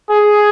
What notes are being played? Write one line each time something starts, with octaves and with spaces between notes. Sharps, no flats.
G#4